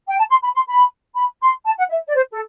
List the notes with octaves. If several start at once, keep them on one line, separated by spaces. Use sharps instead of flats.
G5
A5
C6
B5
C6
B5
B5
C6
A5
F#5
E5
D5
C5
A4